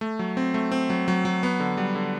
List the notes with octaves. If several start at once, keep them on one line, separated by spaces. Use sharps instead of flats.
A3
F#3
C4
A3
C4
F#3
F#3
F#3
B3
D3
G3
D3